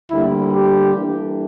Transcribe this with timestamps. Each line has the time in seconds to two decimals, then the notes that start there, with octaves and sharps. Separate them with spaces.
0.10 D2 D3 G3 A#3 E4
0.53 G4
0.95 E3 G3 A#3 D4 A4